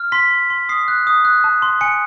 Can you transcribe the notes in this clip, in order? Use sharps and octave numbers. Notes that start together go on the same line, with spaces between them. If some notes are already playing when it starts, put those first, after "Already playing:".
Already playing: F6
C6 B6
C6
C6
D#6 C7
F#6
D#6
F#6
A5
C6
G#5 C#7